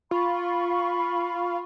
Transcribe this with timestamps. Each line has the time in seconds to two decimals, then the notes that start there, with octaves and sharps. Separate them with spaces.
0.11 F4 F5 B5 C#6